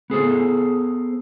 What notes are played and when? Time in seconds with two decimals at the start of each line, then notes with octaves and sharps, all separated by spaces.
0.10 B3 G#4 A4 C5